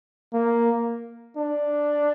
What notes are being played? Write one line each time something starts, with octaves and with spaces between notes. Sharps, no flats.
A#3
D4